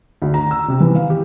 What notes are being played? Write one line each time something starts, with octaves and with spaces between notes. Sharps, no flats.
D2
A#5
E6
C3
E3
F5
G4